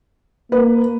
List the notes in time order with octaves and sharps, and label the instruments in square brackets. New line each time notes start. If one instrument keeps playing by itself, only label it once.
[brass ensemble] A#3 [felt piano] B4